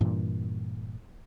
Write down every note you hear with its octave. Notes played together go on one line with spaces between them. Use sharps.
G2 A#2 E3